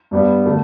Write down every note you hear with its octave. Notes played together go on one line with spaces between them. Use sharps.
G2 G3 B3
D3 A3